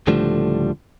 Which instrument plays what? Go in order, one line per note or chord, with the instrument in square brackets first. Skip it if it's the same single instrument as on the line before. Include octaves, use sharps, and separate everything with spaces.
[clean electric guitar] C#2 A2 D3 F3 G3 A3